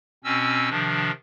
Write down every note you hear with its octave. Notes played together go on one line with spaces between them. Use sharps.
B2 C4 C#4 E6
C3 D#3 F3 D4